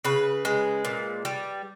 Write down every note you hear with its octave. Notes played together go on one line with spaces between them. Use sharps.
C#3 B4
G#3
A#2
G3